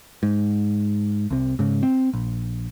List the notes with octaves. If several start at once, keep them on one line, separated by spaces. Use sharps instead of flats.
G#2
C2 C3
G#2 C#3
C4
A#1